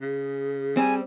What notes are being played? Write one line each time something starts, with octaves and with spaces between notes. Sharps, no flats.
C#3 G#4
G3 C4 G#5